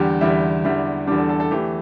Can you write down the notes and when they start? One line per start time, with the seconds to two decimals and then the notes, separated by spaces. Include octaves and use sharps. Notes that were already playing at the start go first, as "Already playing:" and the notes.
Already playing: E2 D3 G3 G4
0.21 E2 D3 G3 E4
0.64 E2 D3 G3 E4
1.07 E2 D3 G3 D4
1.18 A4
1.29 A4
1.40 A4
1.51 E2 E3 A3 G4